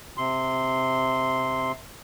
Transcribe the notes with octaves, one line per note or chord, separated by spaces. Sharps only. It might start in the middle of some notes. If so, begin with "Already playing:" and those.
C3 C6